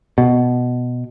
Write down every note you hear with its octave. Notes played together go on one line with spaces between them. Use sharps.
B2